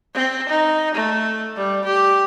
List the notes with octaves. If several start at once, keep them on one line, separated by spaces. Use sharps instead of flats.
C4
D#4
A3
G3
G4